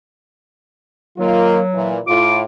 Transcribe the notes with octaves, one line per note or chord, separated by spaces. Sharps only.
D#3 F#3 A#3 F4
A#2 E3
A2 F4 D6